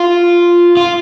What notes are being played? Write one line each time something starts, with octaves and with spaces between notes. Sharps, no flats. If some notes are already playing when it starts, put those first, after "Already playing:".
Already playing: F4
F4